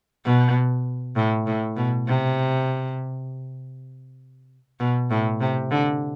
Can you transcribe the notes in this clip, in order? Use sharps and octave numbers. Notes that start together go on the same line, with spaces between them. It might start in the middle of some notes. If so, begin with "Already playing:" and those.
B2
A2
A2
B2
C3
B2
A2
C3
D3